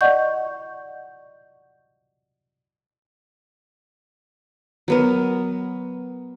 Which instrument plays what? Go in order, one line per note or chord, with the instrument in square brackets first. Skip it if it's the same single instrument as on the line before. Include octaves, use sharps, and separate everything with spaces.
[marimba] D5 D#5 F#5 C#6 G6
[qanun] F#3 B3 A#4